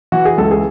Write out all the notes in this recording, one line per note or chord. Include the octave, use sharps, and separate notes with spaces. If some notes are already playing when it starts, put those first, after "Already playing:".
E3 F#4
G#4
C#2 A4
G#4